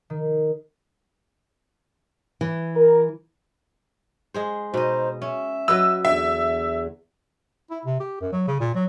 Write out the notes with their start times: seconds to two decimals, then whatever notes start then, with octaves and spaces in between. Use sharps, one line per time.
0.10 D#3
2.41 E3
2.76 A#4
4.34 G#3 G#4 C5
4.74 B2 D#4 C5 D#5
5.22 C#4 E5
5.68 F#3 B4 D#5 E6
6.05 E2 D3 E5
7.70 E4
7.85 C3
8.00 G4
8.21 F#2
8.32 F#3
8.48 C#3
8.60 A#2
8.74 F#3